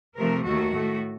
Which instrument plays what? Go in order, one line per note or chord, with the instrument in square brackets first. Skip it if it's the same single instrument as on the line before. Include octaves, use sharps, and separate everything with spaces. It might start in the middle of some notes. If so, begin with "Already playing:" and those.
[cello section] C3 F3 A3 A#4
D#2 D#3 A3 F#4
A2 A3